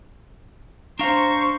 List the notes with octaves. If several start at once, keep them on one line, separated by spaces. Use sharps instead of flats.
D4 C5 F5 A#5 C#6